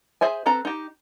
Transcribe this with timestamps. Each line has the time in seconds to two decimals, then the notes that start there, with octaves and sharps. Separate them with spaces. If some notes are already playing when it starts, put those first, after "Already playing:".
0.21 G#4 C5 E5 G#5
0.46 C4 A4 B4 A#5
0.65 D#4 G4